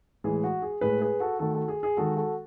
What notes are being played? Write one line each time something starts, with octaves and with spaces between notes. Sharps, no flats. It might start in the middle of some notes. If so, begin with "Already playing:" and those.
A2 E3 G#3 G#4
F#4
G#4
A2 G#3 G#4 B4
G#4 B4
F#4 A4
D#3 A3 F#4 A4
F#4 A4
G#4
G#4
D#3 G#3 F#4 A4
F#4 A4